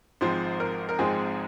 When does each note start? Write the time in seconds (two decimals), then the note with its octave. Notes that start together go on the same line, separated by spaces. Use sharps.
0.21 G#1 G#2 F3 G#3 C4 C5
0.60 A#4
0.89 A#4
0.99 G#1 G#2 F3 G#3 C4 G#4